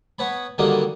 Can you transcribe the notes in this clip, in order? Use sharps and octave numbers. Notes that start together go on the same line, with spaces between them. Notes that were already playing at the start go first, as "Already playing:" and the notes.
B3 C#5 A5 B5
D3 D#3 F#3 G3 A#3 D#4